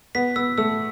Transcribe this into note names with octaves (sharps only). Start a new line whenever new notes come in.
B3 B6
B3 E6
A3 E6